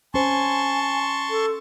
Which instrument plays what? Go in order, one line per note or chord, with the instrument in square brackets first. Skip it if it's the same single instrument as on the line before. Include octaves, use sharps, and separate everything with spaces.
[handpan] C#4 C5 [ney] G#5 [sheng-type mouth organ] A5 C6 C#6
[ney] A4